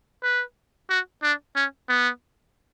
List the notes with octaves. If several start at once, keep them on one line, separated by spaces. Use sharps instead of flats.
B4
F#4
D4
C#4
B3